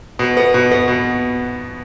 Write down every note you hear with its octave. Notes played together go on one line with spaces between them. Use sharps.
B2
B3
B2
B3
B2